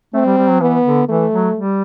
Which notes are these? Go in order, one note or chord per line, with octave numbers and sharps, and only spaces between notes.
A3 C4
G3
G3
F#3
E3 B3
D3
E3 A3
F#3
G3